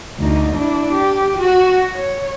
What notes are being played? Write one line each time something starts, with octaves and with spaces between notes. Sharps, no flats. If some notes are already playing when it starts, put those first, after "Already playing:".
D2 D#4
D4 E4
G4
F#4
C#5